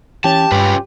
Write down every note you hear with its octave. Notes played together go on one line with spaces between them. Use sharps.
E3 C#4 G4 A5
G2 C#4 F4 B4